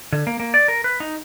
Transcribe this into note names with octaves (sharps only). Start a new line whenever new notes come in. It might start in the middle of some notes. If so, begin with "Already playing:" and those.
D3
A#3
A#3
D5
A#4
B4
D#4